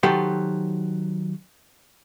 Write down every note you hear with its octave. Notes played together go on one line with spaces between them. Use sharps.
D#3 F#3 G4 A4 C5